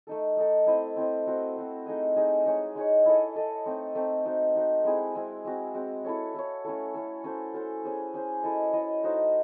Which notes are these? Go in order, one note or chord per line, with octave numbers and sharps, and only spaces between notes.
A3 D#4 A4
A3 D#4 A4
C4 E4 C5 D#5
C4 E4 C5 D#5
C4 F#4 C5
C4 F#4 C5
A3 D#4 G#4 D#5
A3 D#4 G#4 D#5
G#3 D#4 G#4 C#5
G#3 D#4 G#4 C#5
E4 A4 D#5
E4 A4 D#5
A3 C4 D#4
A3 C4 D#4
D#4 F#4 C5
D#4 F#4 C5
G#3 C4 E4 G#4
G#3 C4 E4 G#4
G#3 C4 F#4
G#3 C4 F#4
E4 A4 C#5
E4 A4 C#5
A3 C#4 E4 A4
A3 C#4 E4 A4
C#4 F#4 A4 C5
C#4 F#4 A4 C5
C#4 G#4 C5
C#4 G#4 C5
E4 A4 D#5
E4 A4 D#5
A3 D#4 F#4 C5